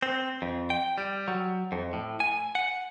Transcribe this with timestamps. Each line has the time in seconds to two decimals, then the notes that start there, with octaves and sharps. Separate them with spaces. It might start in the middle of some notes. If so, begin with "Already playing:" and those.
0.02 C4
0.42 F2
0.70 G5
0.98 G3
1.28 F#3
1.72 F2
1.93 A2
2.20 G#5
2.55 F#5